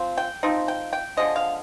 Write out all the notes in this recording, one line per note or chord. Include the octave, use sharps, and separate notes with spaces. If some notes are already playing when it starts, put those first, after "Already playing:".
Already playing: F3 C4
G5
F3 C4 D#4
G5
G5
D3 F3 G#3 D#5
F5